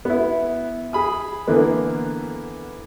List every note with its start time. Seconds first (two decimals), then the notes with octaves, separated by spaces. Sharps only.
0.05 B3 E4
0.93 G#4 B5 D#6
1.47 D3 E3 A#3 B3